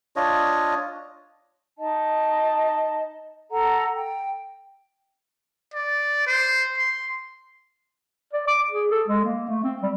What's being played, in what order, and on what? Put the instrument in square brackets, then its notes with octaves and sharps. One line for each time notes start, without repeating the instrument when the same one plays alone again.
[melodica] D4 F4 C#5 D#5
[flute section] D#4 D#5 A5
A4 F#5 A#5
G5
[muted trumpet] D5
C5
C6
[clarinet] D5
D6
G#4
A4
G#3
A#3
A3
C4
G3